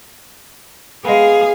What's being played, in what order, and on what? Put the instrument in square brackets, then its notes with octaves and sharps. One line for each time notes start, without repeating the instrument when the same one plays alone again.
[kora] G#3 B3 [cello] G#4 F5